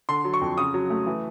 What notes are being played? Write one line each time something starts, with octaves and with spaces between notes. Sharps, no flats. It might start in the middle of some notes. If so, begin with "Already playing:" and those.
D3 C6
F#3
C#6
F2
C#3 D#6
F#3
A3
E3